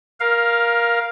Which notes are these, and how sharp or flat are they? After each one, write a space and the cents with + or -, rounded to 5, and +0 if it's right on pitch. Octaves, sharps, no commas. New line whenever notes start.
A#4 +15 F5 +0